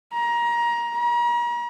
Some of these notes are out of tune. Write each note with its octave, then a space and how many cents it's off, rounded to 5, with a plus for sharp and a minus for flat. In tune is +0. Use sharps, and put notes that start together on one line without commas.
A#5 +20
A#5 +40